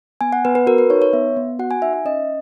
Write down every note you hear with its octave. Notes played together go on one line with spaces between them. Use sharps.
B3 G#5
F#5
B3 B4
B4
F#4 A#4
B4
D#4 C#5
C#5
B3 E5
B3
F#4 F#5
G#5
D#4 E5
E5
C#4 D#5